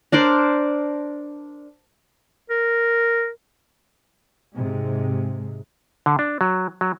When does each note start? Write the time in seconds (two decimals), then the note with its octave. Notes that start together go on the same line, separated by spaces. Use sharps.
0.12 D4 A#4 C5 D5
2.50 A#4
4.55 G#2 C3 G#3
6.06 D3
6.19 D4
6.41 F#3
6.81 F#3